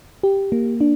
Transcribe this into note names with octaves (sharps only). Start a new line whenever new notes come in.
G4
A#3
D4